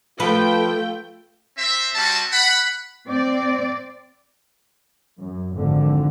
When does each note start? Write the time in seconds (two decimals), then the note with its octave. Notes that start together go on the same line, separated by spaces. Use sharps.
0.20 F3 A3 F4 B4 G5
1.57 C4 C5 E5
1.96 G3 C4 F#4 A5
2.32 F#5 B5
3.07 C4 D5
5.18 F#2
5.53 G#1 F2 D3